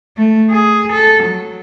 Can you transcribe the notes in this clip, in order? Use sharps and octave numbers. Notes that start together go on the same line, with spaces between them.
A3
G#4
A4
F#3